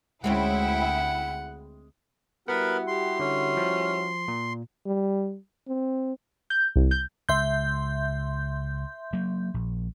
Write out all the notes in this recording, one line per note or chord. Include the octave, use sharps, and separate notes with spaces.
D2 G#3 C4 C#4 E4 F#5 G5
G3 B3 E4 F#4 A#4 B4 F#5 B5
G4 C6
D3 C#4
F3
A#2
G3
C4
G6
C2
G6
C#2 E5 C6 G6
F#3 A#3
A#1